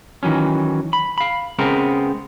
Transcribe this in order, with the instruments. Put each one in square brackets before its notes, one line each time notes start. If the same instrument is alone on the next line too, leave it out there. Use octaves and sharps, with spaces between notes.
[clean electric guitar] D#3 E3 F#3 C#4
B5
F5 B5
C#3 G#3 B3 C4 A#4